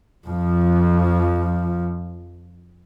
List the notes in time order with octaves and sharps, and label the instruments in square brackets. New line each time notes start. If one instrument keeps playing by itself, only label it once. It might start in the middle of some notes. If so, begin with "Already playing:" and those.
[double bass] F2 F3